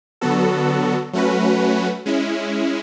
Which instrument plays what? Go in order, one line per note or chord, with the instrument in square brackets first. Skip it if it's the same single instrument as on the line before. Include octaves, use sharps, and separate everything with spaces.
[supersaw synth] D3 F#3 B3 F#4 A4
F#3 A3 C#4 F#4 B4
G#3 C#4 E4